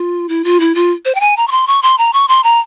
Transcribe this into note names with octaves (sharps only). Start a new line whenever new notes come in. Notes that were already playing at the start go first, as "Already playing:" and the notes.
Already playing: F4
E4
F4
E4
F4
C5
G5
G#5
A#5
C#6
C6
C#6
C6
A#5
C#6
C6
A#5